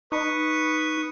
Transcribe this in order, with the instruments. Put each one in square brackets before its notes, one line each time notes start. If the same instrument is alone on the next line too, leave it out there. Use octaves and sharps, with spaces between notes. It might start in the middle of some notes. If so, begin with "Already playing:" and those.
[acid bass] D#4 [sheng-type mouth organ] B4 C#6 D#6